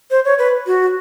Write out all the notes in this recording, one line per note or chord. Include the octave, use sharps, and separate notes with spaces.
C5
C#5
B4
F#4